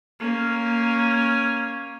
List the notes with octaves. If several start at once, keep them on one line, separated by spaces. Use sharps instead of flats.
A#3 C#4